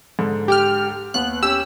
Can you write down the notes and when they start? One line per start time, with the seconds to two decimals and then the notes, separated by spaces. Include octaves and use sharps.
0.19 G#2 D3
0.48 G4 G5 F6
1.14 D#2 B3 F#6
1.43 C#4 G4 E6